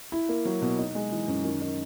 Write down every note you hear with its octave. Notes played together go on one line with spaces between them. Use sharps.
E4
A#3
F#3
B2
D#4
G#3
E3
F#2
D#3
D#4